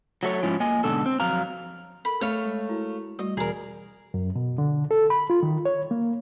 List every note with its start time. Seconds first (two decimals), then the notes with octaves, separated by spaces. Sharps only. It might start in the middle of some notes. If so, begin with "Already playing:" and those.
0.23 F#3 A3 C#5
0.42 G#2 F3 C#4 E4
0.60 A#3 D#5 G#5
0.84 G#2 B2 D3 A4
1.06 C4
1.20 F2 F#3 F5 A#5
2.05 A4 A#4 B5
2.21 A3 C#5 F5
2.45 G#3
2.69 E4 F#4 A#4
3.19 G3 A3 F#4 D#5
3.37 E1 G#4 A#4 A#5
4.14 F#2
4.36 B2
4.58 D3
4.91 A4
5.10 B5
5.30 F4
5.43 D#3
5.65 C#5
5.91 A#3